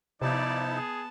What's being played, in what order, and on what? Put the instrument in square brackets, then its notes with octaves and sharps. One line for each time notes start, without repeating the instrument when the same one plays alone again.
[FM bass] C3 [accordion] F3 D#4 E4 [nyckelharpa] B3 A5 [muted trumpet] D5
[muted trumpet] G#4